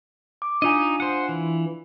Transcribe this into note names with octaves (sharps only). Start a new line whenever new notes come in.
D6
D4 D#4 F4 D#5 G#5
C5 F#5
E3